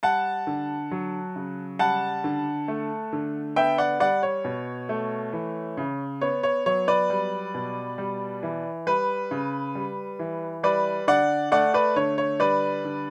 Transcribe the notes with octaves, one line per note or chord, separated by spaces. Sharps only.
G3 F#5 A5
D3
F#3
C#3
G3 F#5 A5
D3
A3
D3
B3 E5 G5
D5 F#5
G3 D5 F#5
C#5
B2
A3
E3
C#3
B3 C#5
C#5
F#3 C#5
B4 D5
G3
B2
G3
E3
G3 B4
C#3
G3
E3
G3 B4 D5
D3 D5 F#5
A3 D5 F#5
B4 D5
D3 C#5
C#5
G3 B4 D5
D3